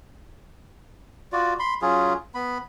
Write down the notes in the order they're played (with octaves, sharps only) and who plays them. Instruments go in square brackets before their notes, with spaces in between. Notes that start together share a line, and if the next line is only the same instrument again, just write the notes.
[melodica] F4 F#4 D5
B5 C6
F#3 C#4 F4 G#4
B3 B5